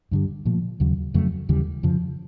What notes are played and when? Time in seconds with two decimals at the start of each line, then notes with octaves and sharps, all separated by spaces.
0.12 G2 D3 G3
0.45 A#2 F3 A3
0.80 D#2 C#3 F#3
1.14 F2 C#3 F#3 A3
1.49 D#2 C#3 E3 G3
1.83 F2 C#3 F3